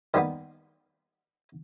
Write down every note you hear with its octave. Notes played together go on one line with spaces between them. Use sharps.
D#3 G3 A#3 B3